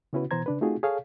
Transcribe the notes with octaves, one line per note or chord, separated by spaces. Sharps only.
C#3 B3 C#4 E4 F#4 B4
B2 E3 B3 C5 A#5 G#6
C#3 D4 B4
A3 C4 D#4 F4 F#4 G#4
G#4 A4 C#5 F5